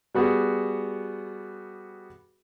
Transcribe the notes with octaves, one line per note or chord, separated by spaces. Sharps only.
G3 B3 F#4 G#4